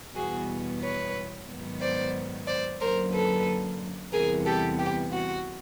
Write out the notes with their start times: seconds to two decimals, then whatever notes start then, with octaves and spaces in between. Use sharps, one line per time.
0.15 E2 B2 G3 B3 F#4 G#4
0.81 B4 C#5
1.48 G#2 D#3 F#3 B3
1.80 C5 D5
2.47 C5 D5
2.80 F#2 D3 F#3 A#3 A#4 C5
3.13 A4 B4
4.13 E2 C3 E3 G3 B3 G#4 A#4
4.45 G4 A4
4.79 G4
5.12 F#4